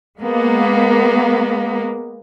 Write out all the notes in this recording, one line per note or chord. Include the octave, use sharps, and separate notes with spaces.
G#3 A#3 B3